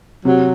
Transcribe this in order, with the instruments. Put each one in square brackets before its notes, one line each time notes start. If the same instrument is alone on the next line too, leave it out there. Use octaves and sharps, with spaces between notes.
[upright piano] C3 [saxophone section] F#3